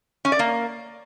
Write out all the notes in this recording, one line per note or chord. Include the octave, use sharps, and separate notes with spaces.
C#4
D5
A#3